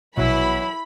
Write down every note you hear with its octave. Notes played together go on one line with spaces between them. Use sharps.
A#1 B2 E3 F#3 E4 B5